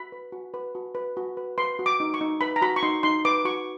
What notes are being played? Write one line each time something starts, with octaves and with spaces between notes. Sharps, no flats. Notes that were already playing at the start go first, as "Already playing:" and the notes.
Already playing: F#4 B5
B4
F#4
B4
F#4
B4
F#4
B4
B4 C6
F#4
D6
D#4
C#6
D#4
B4 B5
A#5
F#4 B5
C#6
D#4 C6
D#4 C6
B4 D6
F#4 C#6